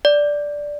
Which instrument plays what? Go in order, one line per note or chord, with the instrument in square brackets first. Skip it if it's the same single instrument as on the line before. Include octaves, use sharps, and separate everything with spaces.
[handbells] D5